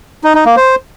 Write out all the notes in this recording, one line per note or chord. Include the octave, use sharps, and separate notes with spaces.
D#4
D#4
A#3
C5